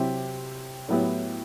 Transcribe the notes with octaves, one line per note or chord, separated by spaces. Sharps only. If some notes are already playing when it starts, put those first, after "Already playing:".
Already playing: C3 F#3 C4 E4 G4
A2 F#3 B3 E4 G4